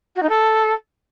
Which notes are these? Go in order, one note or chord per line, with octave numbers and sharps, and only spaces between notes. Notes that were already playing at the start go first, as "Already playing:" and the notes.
F#4
D#4
A4